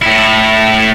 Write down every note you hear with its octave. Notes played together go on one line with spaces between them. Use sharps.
A2 E4